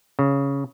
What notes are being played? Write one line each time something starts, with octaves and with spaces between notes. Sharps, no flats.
C#3